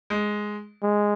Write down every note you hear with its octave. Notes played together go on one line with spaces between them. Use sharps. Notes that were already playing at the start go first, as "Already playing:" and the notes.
G#3
G#3